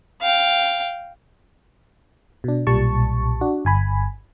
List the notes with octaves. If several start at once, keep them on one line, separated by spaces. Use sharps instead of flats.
F5 G5
B2 D4
B1 A#2 G3 A5 C#6
D4 F#4
G1 G#5 B5